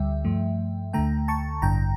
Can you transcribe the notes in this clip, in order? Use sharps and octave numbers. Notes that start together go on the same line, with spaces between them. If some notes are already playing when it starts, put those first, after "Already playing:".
Already playing: D2 D3 G3 E5 G5
G2 F3 A3
D2 D3 A3 G5 A#5
A5 C#6
A1 G2 D3 G5 A#5